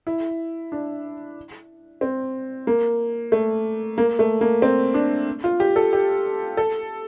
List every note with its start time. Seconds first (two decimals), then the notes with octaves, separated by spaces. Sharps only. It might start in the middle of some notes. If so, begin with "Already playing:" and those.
0.07 E4
0.72 D4
2.01 C4
2.67 A#3
3.32 A3
3.98 A#3
4.19 A3
4.41 A#3
4.62 C4
4.94 D4
5.44 F4
5.60 G4
5.76 A4
5.93 G4
6.57 A4